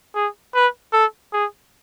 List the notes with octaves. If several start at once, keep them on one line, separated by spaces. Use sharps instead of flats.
G#4
B4
A4
G#4